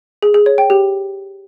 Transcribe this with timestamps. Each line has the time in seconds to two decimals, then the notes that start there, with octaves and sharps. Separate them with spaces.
0.23 G#4
0.34 G#4
0.46 C#5
0.58 G5
0.70 G4